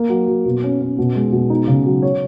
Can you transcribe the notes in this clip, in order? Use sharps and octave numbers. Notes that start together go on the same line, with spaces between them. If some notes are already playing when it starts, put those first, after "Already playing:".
Already playing: A#3
F#3
F#3
B2
C#4
C#4
B2
G#3
B2
D#4
C#3
F#3
C#5